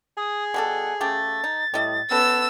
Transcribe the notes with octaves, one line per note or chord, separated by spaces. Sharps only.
G#4 D#6
B2 G3 A4 F#5
C#3 A3 G4 A6
D#4
A2 G3 D#5 E5
B3 C#4 A4 E6